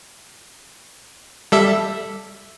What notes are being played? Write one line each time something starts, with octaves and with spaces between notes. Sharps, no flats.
G3 A4 E5